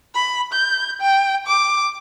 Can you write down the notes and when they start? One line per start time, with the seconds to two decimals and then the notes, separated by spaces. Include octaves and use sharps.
0.15 B5
0.53 G6
1.01 G5
1.47 D6